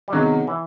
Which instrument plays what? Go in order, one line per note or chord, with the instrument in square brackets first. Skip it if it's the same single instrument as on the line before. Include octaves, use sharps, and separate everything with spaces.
[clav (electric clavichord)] G3
[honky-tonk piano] C3 D#3 G#3 B3 D#4 [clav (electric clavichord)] F#3
[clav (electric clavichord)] E3